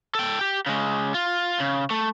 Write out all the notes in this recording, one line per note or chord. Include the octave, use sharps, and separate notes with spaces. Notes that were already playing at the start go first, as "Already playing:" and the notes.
A4 G5
G4
C#3 G#3
F4
C#3
A3